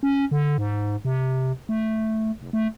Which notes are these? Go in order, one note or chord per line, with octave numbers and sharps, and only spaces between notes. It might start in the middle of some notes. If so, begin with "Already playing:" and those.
C#4
D3
G#2
C3
A3
F1
A3